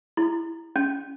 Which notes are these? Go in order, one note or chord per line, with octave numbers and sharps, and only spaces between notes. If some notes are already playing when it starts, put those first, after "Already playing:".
E4
C#4